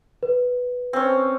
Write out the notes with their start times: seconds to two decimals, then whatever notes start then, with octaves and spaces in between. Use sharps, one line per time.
0.23 B4
0.93 C4 C#4